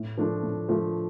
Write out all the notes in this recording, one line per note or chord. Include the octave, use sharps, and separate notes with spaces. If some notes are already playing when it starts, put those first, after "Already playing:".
Already playing: A2
F3 A3 D4 F4
A2
F3 A3 D4 F4